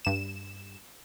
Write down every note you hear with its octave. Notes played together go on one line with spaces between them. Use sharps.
G2 E7